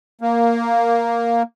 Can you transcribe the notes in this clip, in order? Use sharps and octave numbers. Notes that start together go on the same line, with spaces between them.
A#3